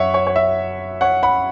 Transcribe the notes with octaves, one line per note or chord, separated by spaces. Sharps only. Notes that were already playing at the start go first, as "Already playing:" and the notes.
Already playing: F#2 C#5 E5 F#5
C#5
C#5
E5
C#5 F#5
F#5 B5